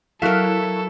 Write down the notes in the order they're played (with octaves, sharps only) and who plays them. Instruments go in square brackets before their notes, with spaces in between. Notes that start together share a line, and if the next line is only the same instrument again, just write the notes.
[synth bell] F#3 E4 [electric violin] A4 [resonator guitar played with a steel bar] A#4 F5